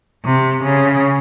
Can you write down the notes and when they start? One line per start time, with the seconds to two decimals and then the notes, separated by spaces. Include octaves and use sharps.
0.25 C3
0.63 C#3